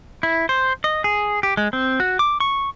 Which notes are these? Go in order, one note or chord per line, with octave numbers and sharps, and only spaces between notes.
E4
C5
D#5
G#4
G4
G#3
C4
F#4
D6
C#6